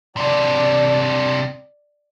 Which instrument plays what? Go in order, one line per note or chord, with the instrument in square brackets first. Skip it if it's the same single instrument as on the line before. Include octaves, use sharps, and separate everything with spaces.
[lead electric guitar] C3 D4 [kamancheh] D5